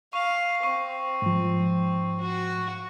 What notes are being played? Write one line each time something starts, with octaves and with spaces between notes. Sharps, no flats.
F5 C#6
C4 C#6 C7
G#2 F3
F#4